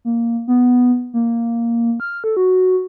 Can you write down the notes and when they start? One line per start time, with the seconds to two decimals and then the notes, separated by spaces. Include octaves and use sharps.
0.05 A#3
0.48 B3
1.14 A#3
2.00 F6
2.24 A4
2.37 F#4